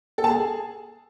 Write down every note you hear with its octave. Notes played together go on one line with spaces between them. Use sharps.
A4
A5
G#4